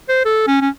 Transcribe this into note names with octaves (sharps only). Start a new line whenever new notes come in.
C5
A4
C#4
C#4